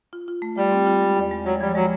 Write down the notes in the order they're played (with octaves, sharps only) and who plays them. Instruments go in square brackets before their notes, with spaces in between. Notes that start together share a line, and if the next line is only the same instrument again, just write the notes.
[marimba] F4
F4
A3
[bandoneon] G3 [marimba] F4
[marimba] C4
F4
G#3
E2
G#3
[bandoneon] F#3 [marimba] G#3
[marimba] F3 [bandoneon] G3
[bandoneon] F#3 [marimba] G#3